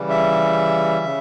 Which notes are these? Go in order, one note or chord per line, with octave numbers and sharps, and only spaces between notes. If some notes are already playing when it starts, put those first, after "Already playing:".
Already playing: C#3 E3 G3
E5
C#3